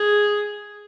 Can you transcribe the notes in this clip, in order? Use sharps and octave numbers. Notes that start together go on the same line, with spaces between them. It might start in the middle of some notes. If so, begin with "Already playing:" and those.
Already playing: G#4